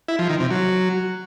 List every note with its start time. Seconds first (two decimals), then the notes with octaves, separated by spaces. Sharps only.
0.08 E4
0.19 F3
0.29 D#3
0.40 C3
0.50 F#3